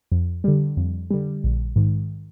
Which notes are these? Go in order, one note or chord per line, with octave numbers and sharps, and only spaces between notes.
F2
D3 G3
F2
D3 G3
A#1
G#2 D#3